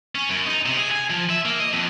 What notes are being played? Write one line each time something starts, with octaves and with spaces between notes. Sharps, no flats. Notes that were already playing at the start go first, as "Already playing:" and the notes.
C#4
F#2
D#4
C3
G#4
G#5
F3
E5
A#3
D#5
F2